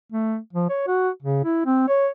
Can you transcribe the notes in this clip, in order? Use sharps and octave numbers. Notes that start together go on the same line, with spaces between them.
A3
F3
C#5
F#4
C#3
E4
C4
C#5